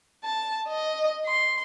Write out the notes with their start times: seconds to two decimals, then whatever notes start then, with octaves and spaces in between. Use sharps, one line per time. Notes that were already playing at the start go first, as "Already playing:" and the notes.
0.23 A5
0.68 D#5
1.26 C6